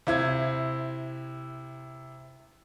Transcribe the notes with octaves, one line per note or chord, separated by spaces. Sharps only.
C3 E4 G#6